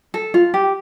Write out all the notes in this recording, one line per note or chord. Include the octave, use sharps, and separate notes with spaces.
A4
F4
G4